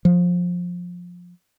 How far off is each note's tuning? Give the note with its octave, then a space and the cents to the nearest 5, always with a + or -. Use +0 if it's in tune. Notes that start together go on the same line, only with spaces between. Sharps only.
F3 +20